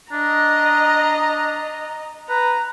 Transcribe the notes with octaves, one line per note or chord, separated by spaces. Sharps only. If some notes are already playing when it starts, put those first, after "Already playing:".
D4 D#5 A#5
B4 A#5